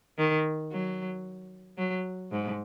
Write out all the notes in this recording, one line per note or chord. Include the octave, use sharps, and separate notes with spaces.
D#3
F#3
F#3
G#2